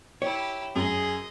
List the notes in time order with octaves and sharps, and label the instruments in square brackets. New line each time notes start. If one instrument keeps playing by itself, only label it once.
[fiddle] E4 G4 [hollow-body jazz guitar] C#5
[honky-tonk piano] F#2 [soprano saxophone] G#4 [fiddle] D#5